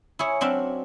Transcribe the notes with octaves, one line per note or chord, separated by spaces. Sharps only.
E4 G#4 C#5
F#3 C4 D4 E5 F5